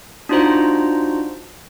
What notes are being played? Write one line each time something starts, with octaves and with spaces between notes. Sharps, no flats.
D4 D#4 F4 F#4 C5 A#5